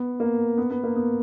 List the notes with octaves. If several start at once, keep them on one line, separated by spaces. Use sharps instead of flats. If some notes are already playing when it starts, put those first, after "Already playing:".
Already playing: B3
A#3
B3
B3
A#3
B3